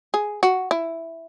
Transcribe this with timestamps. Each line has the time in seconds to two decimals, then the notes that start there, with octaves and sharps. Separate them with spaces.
0.14 G#4
0.43 F#4
0.71 E4